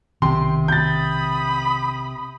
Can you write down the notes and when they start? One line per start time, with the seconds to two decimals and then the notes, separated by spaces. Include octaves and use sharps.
0.22 B1 C3 D#3 G5 C6
0.68 B5 D#6 G6 A6